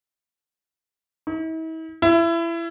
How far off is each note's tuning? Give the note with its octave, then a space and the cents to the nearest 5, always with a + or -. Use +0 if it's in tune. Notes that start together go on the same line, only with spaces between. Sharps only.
E4 -45
E4 +25